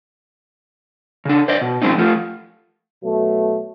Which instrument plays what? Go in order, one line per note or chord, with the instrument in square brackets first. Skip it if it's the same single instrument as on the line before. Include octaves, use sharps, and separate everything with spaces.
[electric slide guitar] C#3 D4
C5 D5 D#5
B2
F3 G#3 C4 C#4 D#4
F3 A3 F4
[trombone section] B2 F#3 A3